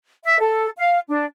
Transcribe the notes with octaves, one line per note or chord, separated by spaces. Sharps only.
E5
A4
F5
D4